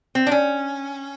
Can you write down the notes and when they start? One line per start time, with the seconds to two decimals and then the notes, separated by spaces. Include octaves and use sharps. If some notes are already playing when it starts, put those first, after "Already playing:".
0.15 C4
0.26 D4
0.31 C#4